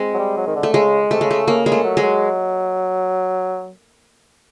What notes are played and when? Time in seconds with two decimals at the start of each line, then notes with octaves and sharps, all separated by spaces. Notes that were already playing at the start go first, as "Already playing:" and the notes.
Already playing: G#3 C4
0.14 F#3
0.18 G3
0.37 F#3
0.47 D#3
0.56 D3
0.63 A3
0.74 C#3 G#3
1.11 C3 A3
1.21 C#3 G#3
1.31 A3
1.47 C#3 A#3
1.66 C#3 G#3
1.72 A3
1.84 F#3
1.97 G#3
2.03 F#3